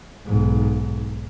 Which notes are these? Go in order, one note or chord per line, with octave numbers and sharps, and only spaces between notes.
B1 G#2